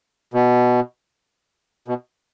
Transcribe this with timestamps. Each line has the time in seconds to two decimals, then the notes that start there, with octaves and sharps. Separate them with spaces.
0.34 B2
1.88 B2